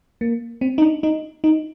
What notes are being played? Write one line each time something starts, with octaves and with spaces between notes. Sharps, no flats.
A#3
C4
D#4
D4
D#4
D#4